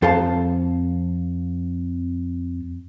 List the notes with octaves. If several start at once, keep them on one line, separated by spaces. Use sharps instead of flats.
F2 A4 C5 F5 A5